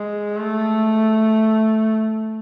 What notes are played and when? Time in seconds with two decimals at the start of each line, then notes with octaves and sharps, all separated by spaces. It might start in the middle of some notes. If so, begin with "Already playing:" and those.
Already playing: G#3
0.37 A3